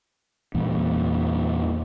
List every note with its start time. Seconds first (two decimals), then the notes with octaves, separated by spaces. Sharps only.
0.54 E2 A#2